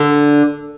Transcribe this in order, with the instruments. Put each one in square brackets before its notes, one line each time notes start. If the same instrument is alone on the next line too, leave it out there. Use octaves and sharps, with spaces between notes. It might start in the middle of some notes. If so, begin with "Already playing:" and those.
Already playing: [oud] D3